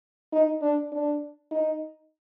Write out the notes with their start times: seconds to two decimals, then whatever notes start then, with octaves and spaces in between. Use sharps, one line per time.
0.33 D#4
0.62 D4
0.92 D4
1.51 D#4